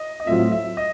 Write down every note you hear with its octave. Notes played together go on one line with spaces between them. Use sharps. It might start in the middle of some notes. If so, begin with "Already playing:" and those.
Already playing: D#5
D#5
A2 F#3 A3 C4 F4 E5
E5
D#5